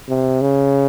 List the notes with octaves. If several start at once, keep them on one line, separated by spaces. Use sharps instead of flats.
C3
C#3